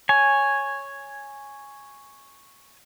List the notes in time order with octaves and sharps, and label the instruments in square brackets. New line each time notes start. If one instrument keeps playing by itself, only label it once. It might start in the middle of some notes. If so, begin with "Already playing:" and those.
[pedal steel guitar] C#5 G#5